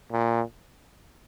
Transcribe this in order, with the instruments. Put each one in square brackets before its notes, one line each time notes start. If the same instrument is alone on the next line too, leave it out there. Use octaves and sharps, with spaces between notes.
[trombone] A#2